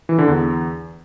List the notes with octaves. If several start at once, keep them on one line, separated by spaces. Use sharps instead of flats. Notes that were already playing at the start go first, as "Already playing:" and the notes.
E3
D3
E2